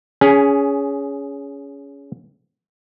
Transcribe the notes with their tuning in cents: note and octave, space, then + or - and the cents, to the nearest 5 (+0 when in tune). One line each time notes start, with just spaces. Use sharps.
C#4 +20 G#4 +0